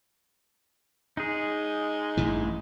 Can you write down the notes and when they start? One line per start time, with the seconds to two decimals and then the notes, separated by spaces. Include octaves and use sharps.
1.17 G#3 D#4 G#4
2.17 A1 G2 E3